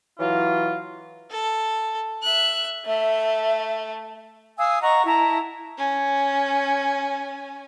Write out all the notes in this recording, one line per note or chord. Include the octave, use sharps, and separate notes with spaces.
E3 F#3 F4
A4
E5 F#6
A3 E5
F5 G#5 D#6 E6
D#5 F#5 A#5 C#6
E4 A5 A#5
C#4 G#5